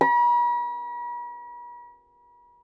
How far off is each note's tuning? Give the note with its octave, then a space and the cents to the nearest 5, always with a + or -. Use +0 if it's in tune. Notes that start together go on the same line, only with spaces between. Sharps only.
B5 -45